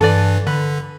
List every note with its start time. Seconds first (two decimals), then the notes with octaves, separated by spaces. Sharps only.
0.01 G2 E3 A4 B4 D5
0.47 D3 B4